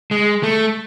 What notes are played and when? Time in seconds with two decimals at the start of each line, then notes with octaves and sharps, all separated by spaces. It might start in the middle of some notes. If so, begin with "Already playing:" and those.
0.11 G#3
0.43 A3